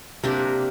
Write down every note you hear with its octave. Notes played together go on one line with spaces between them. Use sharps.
C3 A#3 D4 G4 A#4